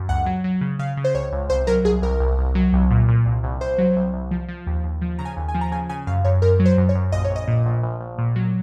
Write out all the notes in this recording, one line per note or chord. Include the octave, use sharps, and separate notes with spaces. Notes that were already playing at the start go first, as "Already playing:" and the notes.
Already playing: F#2
C#2 F#5
F#3
F#3
C#3
C#3 F5
C#3
C5
C#2 C#5
C#2
C2 C5
F#3 A#4
C2 G#4
C2 A#4
C2
C2
F#3
C2
A#2
A#2
C2
C2
C2 C5
F#3
C2
C2
F3
F3
D#2
D#2
F3
C#3 A#5
G#5
D#2
G#5
F3
A#5
C#3 G#5
C#3 G#5
F#2 F5
F#2 C#5
F#2 A#4
F#3
C5
F#2
C#5
F#2
A#1 D#5
C#5
A#1
D#5
A#2
A#1
A#1
A#1
A#2
F#3